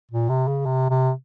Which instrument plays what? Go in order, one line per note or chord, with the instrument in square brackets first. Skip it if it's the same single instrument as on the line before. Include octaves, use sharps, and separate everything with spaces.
[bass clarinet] A#2
C3
C#3
C3
C3